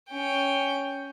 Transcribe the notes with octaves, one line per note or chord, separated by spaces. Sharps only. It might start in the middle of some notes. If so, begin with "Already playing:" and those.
C#4 G5